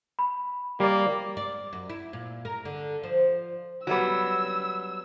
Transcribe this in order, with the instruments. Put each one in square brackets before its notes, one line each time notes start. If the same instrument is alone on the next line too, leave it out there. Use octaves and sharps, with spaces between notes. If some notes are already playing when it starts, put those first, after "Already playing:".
[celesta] B5
[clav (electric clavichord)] G3 D5 [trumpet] A#3
[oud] D5
F#2
E4
A#2
A#4
D3
F3
[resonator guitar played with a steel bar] F#3 G3 B3 [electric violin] E6